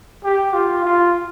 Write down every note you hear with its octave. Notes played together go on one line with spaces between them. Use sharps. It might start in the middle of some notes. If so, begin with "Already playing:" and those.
G4
F4
F4